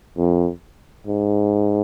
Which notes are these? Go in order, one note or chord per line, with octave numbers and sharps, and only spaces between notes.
F2
G#2